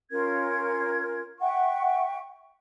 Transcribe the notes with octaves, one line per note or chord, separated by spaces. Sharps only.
C#4 F4 A#4 G#6
E5 F#5 G5 C#6